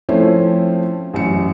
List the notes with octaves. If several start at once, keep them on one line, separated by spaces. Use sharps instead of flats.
F3 A3 C4 C#4 E4
A1 F#2 C#7